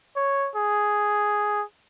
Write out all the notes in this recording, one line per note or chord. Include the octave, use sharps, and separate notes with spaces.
C#5
G#4